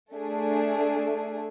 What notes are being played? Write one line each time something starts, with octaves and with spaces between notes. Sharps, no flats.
A3 D4 G#4